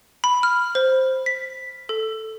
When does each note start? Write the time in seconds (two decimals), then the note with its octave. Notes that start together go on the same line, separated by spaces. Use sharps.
0.24 B5
0.43 F6
0.75 C5
1.26 B6
1.89 A4